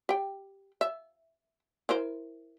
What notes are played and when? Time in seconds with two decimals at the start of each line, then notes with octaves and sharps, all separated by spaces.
0.09 G4 G5
0.81 E5
1.89 E4 A#4 C5